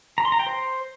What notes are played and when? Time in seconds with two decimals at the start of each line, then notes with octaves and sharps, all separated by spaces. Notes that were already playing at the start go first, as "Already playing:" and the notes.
0.18 A#5
0.25 C6
0.32 A#5
0.39 G5
0.47 C5